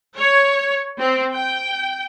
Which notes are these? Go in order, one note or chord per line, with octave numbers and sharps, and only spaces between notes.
C#5
C4
G5